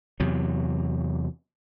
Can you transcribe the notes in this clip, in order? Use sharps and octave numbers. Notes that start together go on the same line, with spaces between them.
E2 C3 F#3